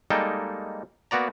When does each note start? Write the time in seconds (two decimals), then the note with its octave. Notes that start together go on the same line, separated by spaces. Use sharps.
0.10 G3 G#3 A#3 D#4 A4 G5
1.11 A#3 B3 F#4 D5 A#5